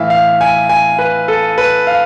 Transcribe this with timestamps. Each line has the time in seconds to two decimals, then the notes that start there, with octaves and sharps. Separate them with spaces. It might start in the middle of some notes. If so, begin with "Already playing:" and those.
Already playing: A2 E3 E5 F5
0.10 F5
0.41 G#5
0.69 G#5
0.99 B4
1.28 A4
1.58 B4
1.87 F5